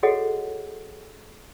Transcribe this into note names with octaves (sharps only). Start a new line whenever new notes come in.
F#4 G#4 A4 C#5 D#5 F#5